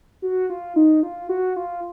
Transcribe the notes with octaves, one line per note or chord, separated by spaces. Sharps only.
F#4
F4
D#4
F4
F#4
F4